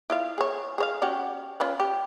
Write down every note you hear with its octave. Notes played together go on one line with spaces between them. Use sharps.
E4 F4 F5
G#4 C#5
G#4 C#5 F5
C#4 F#4 G4
C#4 F4 B4
G4